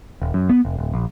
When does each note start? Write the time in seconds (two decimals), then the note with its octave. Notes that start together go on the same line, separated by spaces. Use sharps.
0.22 D#1
0.34 F#2
0.49 B3
0.65 F1
0.78 D1
0.94 A#1